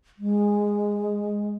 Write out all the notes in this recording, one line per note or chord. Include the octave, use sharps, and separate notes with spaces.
G#3